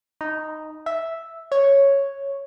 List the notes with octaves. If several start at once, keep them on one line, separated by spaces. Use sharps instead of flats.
D#4
E5
C#5